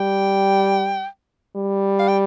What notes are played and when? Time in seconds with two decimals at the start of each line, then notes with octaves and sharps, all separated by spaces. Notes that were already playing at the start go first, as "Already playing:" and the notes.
Already playing: G3 G5
1.56 G3
1.99 F5
2.08 G5